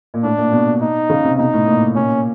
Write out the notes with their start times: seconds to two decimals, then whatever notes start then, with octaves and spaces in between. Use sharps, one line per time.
0.14 A#2
0.23 A2 D4
0.37 A#2
0.52 B2
0.81 D#4
1.09 C#3
1.24 C3
1.38 B2 D#4
1.53 A2
1.67 A#2
1.96 A#2 C#4